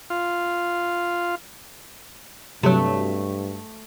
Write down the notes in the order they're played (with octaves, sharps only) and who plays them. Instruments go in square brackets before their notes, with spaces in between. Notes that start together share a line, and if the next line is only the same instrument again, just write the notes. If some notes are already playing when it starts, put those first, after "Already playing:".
[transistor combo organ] F4
[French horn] G2 [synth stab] C3 F#3 [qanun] A3